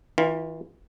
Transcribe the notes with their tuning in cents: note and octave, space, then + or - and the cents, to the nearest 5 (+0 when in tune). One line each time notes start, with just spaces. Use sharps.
E3 -35 F4 +0